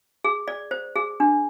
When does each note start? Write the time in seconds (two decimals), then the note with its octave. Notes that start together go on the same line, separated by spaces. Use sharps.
0.24 G#4
0.48 D5
0.71 C5
0.96 G#4
1.20 D4